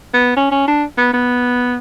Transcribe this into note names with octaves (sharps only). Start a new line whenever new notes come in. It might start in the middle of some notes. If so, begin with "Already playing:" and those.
B3
C#4
C#4
D4
B3
B3